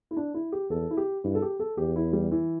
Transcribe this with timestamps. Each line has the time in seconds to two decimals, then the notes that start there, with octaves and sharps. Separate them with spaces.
0.11 E4
0.17 D4
0.34 E4
0.52 G4
0.70 E2 A4
0.91 E4
0.97 G4
1.24 G2 E4
1.35 A4
1.42 G4
1.59 A4
1.77 E2 G4
1.96 E4
2.13 G3
2.31 E3